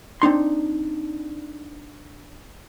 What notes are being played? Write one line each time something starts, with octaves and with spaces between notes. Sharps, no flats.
C4 D4 D#4 C6